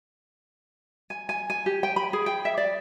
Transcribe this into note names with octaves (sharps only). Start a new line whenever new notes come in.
G#5
G#5
G#5
G4
G5
B5
G#4
G5
E5
D5